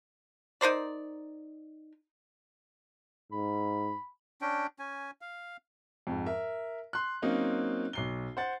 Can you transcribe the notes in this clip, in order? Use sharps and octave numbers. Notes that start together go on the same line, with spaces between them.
D#4 A#4 C5 D5
G#2 B5
C#4 D4 G5
C#4 G#5
F5
F2 G#2
A#4 E5
C6 F#6
F#3 A#3 C4 C#4 D#4
B1 C7 G7
C5 F#5 A6